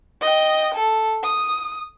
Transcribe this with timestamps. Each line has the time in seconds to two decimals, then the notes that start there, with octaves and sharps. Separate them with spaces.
0.21 D#5 G5
0.75 A4
1.23 D#6